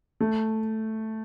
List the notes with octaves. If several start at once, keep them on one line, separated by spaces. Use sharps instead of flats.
A3